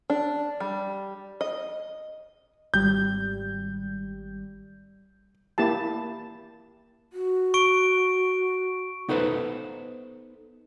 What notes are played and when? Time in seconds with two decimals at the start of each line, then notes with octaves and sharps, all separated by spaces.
0.10 D4
0.60 G3
1.41 D#5
2.74 G#1 G3 G6
5.58 A#3 E4 G4 A5
7.13 F#4
7.54 C#6 D7
9.09 B3 D#4 A4 B4 C5